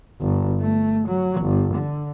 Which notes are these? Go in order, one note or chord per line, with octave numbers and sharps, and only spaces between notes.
G1
A3
F#3
G1
D3